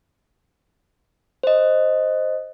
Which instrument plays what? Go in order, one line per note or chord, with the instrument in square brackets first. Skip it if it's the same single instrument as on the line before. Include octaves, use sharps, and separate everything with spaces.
[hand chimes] C5 D#5